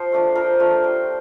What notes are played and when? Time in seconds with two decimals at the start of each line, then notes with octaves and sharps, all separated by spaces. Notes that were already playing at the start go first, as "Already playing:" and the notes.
Already playing: F3 C5
0.12 A3 D4 F4
0.35 F3 A#4
0.59 A3 D4 F4
0.84 G3